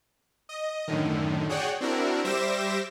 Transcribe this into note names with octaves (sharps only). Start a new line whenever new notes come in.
D#5
F#2 A2 D3 D#3
F#4 G#4 C#5 D5 F#5 G5
C4 D4 E4 F#4 A#4
G3 C5 E5 D6 A#6 E7